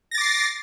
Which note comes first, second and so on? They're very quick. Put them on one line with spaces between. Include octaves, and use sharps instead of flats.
A#6 A6 D6 C7